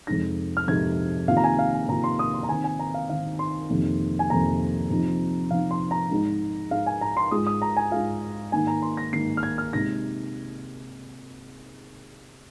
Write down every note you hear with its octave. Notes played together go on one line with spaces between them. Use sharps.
F2 C3 G#3 D#4 A#6
F6
F2 C3 G#3 D#4 G#6
C3 D#3 A#3 F4 F5
A#5
G#5
F5
G#5
C3 D#3 A#3 F4 A#5
C6
D#6
C6
A#5
D#3 C4 D#4 G#5
G#5
A#5
F5
D#3 C4 D#4 F5
C6
F2 C3 D#3 A#3
G#5
F2 C3 D#3 A#3 A#5
C3 F3 C4 D#4
C3 F3 C4 D#4 F5
C6
A#5
G#2 G#3 D#4
G#2 G#3 D#4 F5
G#5
A#5
C6
G#2 G#3 F4 D#6
D#6
A#5
G#5
G#2 G#3 F4 F5
G#2 D#3 A#3 D#4 G#5
A#5
C6
A#6
G#2 D#3 A#3 D#4 C7
F6
G#6
F6
C3 G#3 D#4 A#6